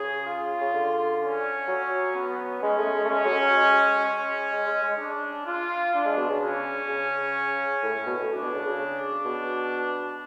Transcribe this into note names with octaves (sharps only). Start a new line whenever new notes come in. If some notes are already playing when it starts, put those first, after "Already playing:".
Already playing: C#3 G#4
F4
C#3
D3
C#4
F#3
B3
G#3 C#4
A3
G#3
A3
G#3 C#4
F#3
F#3
G#3
C#4
G#3
G#3
G#3
D4
F4
D4
G#3
B2
C#3
C#4
C#3
A2
A2
B2
A2
A2 D4
B2
C#3
C#3
B2